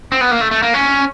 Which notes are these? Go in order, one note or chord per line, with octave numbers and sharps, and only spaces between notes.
C4
B3
A#3
A3
A3
A#3
C#4